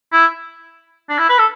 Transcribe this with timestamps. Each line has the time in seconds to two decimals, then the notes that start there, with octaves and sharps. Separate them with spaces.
0.12 E4
1.09 D4
1.19 E4
1.29 B4
1.39 A4